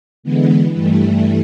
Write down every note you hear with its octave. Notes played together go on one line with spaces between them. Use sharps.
D3 E3 G#3 B3
G2 E3 G3 A3